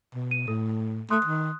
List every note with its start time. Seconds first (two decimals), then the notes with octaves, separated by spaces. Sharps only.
0.15 B2
0.31 D#7
0.48 A2 A4
1.10 A3 C6 D#6 F#6
1.25 D#3